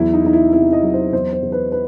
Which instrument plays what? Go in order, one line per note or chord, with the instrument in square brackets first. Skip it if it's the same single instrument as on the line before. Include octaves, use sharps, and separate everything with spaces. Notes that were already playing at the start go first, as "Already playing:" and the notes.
Already playing: [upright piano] E2 F#3 E4
D#4
E2 D#4
E4
C3 E4
D#5
F#3
C5
E2 C5
C5
E2
B4
B4